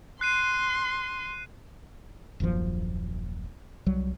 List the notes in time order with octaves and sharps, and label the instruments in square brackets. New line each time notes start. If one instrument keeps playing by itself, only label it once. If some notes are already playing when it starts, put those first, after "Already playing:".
[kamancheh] C6 [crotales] F#6 C7 D#7
[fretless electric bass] D#1 A#1 F#2 F3
C2 F#3 G3